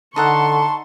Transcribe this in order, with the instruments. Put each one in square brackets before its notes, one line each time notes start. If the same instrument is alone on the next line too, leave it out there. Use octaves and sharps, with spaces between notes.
[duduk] D3 [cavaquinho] D#4 A4 F#5 [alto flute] A5 [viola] C6 C#6